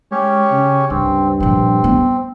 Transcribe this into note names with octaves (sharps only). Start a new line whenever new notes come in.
G#3 C#4 G4 C#5
C#3
C#2 G2 C4
A#2 F3 C4
B3